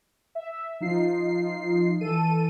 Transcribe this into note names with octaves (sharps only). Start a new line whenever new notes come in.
E5
F3 D#4 F4 C7
E3 A4 D#7